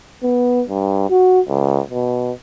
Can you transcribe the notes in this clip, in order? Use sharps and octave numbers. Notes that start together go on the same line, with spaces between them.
B3
G2
F#4
C#2
B2